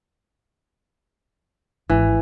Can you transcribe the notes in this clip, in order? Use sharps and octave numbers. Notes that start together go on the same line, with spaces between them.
G#1 E3